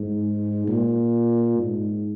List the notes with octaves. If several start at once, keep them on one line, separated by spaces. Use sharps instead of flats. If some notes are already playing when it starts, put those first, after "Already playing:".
Already playing: G#2
A#2
G#2